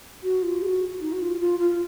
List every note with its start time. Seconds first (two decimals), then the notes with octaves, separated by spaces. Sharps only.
0.23 F#4
0.42 F4
0.62 G#4
0.65 F#4
1.00 D#4
1.12 F#4
1.20 F4
1.40 F4
1.59 F4